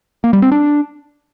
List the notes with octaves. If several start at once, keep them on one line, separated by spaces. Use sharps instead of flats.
A#3
G3
C4
D4